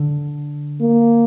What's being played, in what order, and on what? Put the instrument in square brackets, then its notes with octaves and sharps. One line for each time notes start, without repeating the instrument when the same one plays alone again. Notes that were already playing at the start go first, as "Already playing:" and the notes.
Already playing: [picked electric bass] D3
[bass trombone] A#3